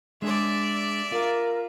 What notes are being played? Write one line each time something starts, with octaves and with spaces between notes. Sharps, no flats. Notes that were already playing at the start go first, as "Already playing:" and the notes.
G#3 D4 G#4 D5 E5
F4 A#4 F5